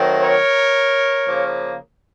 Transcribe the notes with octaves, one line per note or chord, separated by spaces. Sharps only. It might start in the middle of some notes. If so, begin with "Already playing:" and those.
Already playing: D#3 F#3 A3 C4
A#4 C#5
C#3 F3 A#3